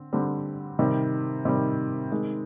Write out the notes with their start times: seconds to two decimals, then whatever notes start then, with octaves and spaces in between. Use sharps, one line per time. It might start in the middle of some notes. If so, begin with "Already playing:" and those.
Already playing: D3 C4
0.13 D3 G3 C4
0.79 C3 D#3 G3
1.45 C3 D#3 G3
2.12 C3 D#3 G#3